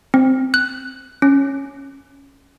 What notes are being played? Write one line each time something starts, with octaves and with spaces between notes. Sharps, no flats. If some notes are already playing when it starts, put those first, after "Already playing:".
C4
F#6
C#4